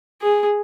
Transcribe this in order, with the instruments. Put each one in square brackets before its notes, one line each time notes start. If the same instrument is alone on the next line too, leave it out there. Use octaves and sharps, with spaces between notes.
[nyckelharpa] G#4